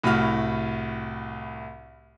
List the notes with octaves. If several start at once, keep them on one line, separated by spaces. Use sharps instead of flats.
C2 A2 F#4 B5 F6